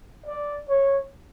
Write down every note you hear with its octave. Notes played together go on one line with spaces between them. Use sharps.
D5
C#5